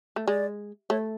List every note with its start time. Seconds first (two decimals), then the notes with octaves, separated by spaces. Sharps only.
0.16 A3
0.27 G#3 D5
0.90 A3 C#5